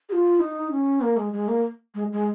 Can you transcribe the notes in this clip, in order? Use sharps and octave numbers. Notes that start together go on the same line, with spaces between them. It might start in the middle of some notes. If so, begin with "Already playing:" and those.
G#4
F4
D#4
C#4
A#3
G#3
G#3
A#3
G#3
G#3